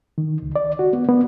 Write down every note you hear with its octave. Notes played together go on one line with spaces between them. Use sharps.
D#3
C#2
D5
F#4
B3
B3